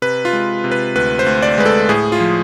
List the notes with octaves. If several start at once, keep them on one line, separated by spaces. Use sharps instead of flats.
C3 B4
F4
G#3
C3
B4
D2 B4
C5
D2
D5
G#3 B4
A4
A2 G#4
F4
F3